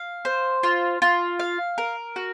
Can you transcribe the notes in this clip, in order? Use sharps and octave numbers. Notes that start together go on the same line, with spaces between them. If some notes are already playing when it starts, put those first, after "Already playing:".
Already playing: F5
C5
F4
F4
F5
A#4
F#4